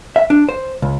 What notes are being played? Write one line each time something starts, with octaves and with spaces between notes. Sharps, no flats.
E5
D4
C5
C#2